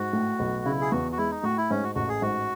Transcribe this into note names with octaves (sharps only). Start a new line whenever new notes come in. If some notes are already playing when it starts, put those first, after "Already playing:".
Already playing: G#2 F#4
A2
B1
C#3 E4
G#4
E2 F#4
F#4
G#3 E4
D#4
A2 F#4
E4
G#2 C#4
F#4
A1 F#4
G#4
G#2 F#4